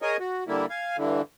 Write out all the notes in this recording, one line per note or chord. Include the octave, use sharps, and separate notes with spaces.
G#4 A#4 C#5 D#5 G#5 D#6
F#4
D3 G3 A#3 E4
F5 G#5
G2 D3 E3